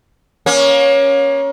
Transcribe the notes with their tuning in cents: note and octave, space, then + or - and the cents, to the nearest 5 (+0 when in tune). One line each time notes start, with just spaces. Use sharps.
A#3 +25 C#4 +0